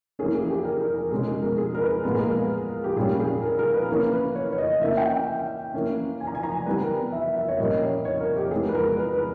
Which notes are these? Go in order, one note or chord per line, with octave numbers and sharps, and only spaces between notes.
E3 A#3 C#4 G#4
G#4
G4
A#4
A#4
A#4
B2 G#3 C#4 G#4
G#4
A#4
G#4
A#4
B4
A#2 G#3 B3 A#4
G#4
A#4
G4
A#2 G3 C#4 G#4
G#4
A#4
A#4
B4
E3 A#3 C#4 A#4
B4
C#5
C#5
D#5
E3 A#3 C#4 E5
G5
E3 A#3 C#4
G#5
A#5
G#5
A#5
E3 G3 B3 B4
A#4
E5
E5
C#5
A#2 G3 A#3 C#4 D#5
C#5
C#5
A#4
G4
E3 G#3 B3 G#4
B4
A#4
B4
B4